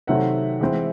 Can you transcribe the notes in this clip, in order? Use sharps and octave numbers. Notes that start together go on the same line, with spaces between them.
C3 D#3 F#3 A3 C4 E5 F#5
E3 G#3 C4